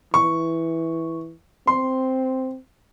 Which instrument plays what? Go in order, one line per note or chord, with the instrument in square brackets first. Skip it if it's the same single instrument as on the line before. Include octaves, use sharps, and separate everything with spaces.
[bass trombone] E3 [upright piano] C#6
[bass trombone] C4 [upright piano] C6